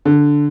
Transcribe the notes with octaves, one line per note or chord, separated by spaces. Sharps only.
D3